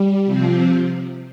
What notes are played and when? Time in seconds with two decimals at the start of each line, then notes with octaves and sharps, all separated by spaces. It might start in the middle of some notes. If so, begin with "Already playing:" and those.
Already playing: G3
0.25 C3 F3 C4